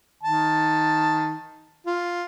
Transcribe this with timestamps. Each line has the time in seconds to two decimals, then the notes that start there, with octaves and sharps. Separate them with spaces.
0.23 D#3 A5
1.86 F4